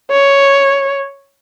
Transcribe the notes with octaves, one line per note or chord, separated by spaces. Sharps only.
C#5